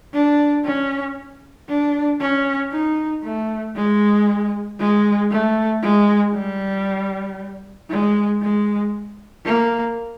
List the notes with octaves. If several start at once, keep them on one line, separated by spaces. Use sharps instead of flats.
D4
C#4
D4
C#4
D#4
A3
G#3
G#3
A3
G#3
G3
G#3
G#3
A#3